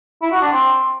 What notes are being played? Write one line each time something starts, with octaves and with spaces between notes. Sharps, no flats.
E4
F#4
D4
C4